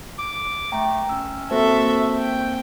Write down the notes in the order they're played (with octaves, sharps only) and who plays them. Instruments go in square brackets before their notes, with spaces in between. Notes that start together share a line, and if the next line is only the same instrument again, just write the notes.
[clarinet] D6
[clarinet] A3 [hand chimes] G5 A#5
[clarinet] C#4 [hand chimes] E6
[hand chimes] A#3 C4 C5 [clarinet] F#4 [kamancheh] A4 E5
[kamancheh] G5